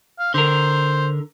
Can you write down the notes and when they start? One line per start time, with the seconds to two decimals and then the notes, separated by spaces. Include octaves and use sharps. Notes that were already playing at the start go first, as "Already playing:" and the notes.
0.19 F5
0.34 D3 A#4 C5